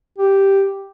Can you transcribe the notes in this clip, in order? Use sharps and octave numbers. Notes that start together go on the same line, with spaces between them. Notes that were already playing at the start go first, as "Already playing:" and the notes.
G4